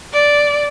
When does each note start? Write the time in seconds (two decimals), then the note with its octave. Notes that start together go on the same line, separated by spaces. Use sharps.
0.13 D5